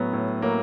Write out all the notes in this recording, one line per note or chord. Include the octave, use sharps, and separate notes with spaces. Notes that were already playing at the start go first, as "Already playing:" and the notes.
Already playing: A2 F#3 B3
A2
F#3 A#3